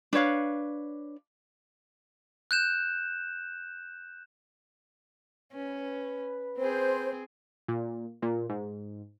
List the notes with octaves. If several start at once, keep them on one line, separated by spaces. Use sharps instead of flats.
D4 B4 C#5 F5
F#6 G6 E7
C#4 B4
C4 G#4 C5
A#2
A#2
G#2